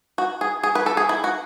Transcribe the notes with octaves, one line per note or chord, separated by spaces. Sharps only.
F#4
G#4
G#4
B4
A4
G#4
E4
F#4